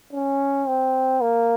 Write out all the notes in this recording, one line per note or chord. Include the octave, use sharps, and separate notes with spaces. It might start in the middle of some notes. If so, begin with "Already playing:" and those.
C#4
C4
A#3